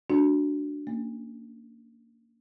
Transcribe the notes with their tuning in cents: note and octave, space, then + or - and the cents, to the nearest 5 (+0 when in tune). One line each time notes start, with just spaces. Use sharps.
A3 -5 D4 +0 F#4 +0
A#3 -20 C#4 +15